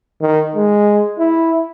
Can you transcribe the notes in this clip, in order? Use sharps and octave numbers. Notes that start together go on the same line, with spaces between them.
D#3
G#3
E4